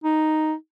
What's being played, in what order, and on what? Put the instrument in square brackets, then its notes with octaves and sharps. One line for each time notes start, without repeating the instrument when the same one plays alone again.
[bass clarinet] D#4